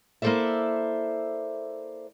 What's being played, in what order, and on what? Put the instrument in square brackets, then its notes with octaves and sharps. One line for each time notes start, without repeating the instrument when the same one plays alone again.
[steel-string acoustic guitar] A#3 E4 A4 C5 D5 E5